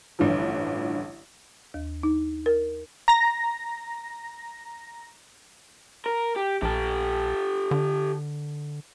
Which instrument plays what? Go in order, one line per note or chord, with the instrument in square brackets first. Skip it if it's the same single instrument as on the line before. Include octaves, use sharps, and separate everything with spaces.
[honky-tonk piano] A1 G2 D3 E3 F3
[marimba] D#2
D#4
A#4
[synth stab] A#5 A#6
[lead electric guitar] A#4
G4
[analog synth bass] A#1 [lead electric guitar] G4 A4
[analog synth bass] D3